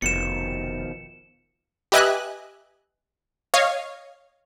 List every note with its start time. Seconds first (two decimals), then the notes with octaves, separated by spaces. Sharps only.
0.02 F1 B2 D#3 F3 C#7 E7
1.92 G4 B4 D#5 E5 G#5 F#6
3.54 C#5 D#5 F5